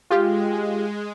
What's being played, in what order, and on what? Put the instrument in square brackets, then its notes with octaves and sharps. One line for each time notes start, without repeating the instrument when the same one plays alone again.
[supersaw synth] G#3 [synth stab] F4 G4